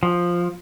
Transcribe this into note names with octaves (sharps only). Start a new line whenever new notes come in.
F3